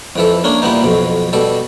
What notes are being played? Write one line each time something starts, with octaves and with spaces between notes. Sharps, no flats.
F2 E3 A4
A#3 C#4 D4
A#2 E3 G3 B3 D#4
B1 F2 B2
B2 G3 A4